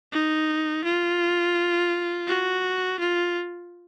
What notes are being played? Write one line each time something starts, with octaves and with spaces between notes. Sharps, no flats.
D#4
F4
F#4
F4